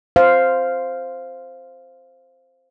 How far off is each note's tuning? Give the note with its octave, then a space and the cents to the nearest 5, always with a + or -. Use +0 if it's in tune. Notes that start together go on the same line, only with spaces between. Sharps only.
C5 +0 F5 +0